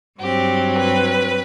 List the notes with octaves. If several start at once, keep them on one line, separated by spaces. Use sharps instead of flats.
G2 F#3 C4 G4
B4